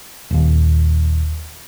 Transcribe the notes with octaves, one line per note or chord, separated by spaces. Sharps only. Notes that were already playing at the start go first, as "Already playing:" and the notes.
D#1 D#2